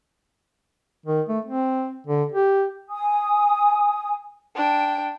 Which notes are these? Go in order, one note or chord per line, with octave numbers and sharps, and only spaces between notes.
D#3
A3
C4
D3
G4
G#5 D#6
D4 G5